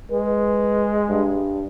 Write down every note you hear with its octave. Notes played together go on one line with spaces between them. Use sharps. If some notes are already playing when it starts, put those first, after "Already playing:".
G#3 B4
G2